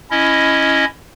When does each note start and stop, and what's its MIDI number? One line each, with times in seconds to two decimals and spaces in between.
0.11 0.85 61
0.11 0.85 64
0.11 0.85 75